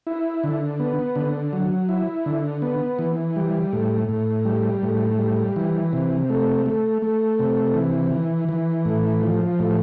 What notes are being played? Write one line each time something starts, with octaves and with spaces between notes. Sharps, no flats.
E4
D3
B3
D3
F#3
E4
D3
B3
E3
G3
A2
A2
G3
A2
G3
E3
C3
A3
A3
A3
C3
E3
E3
E3
A2
F3
A2